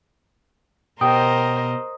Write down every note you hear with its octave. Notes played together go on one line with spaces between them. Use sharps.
B2 G4 A#4 C5 D#5 G5 D#6